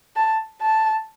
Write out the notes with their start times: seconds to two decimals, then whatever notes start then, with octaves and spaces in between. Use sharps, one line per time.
0.16 A5
0.62 A5